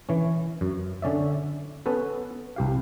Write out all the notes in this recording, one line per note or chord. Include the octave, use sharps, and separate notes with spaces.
E3 C#4
F#2
D3 C#4 D5 E5
B3 C#4 A4 B4
C2 G4 F5